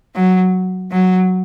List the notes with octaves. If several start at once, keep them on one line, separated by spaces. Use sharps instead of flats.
F#3
F#3